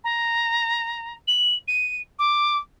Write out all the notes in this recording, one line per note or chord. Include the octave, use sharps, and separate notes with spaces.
A#5
F#7
D#7
D6